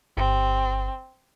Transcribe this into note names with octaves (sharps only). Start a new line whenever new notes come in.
G1 C4